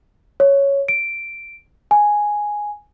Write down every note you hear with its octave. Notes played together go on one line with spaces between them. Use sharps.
C#5
D7
G#5